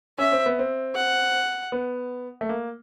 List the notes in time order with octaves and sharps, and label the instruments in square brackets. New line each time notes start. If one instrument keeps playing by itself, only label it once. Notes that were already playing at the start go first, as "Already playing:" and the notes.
[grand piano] C#4 [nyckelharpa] E5
[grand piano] C4
B3
C4
[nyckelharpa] F#5
[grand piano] B3
A3
A#3